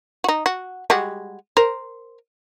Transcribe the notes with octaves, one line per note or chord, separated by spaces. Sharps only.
D#4 F#4
F#4
G3 G#3 F#4
A#4 C5